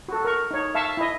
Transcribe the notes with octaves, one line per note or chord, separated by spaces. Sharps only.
F#4 A4
A#4 C#6
D#4 C#5
E5 F5 A5 C#6
E4 D#5